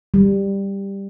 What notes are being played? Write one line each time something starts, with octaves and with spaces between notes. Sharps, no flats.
G3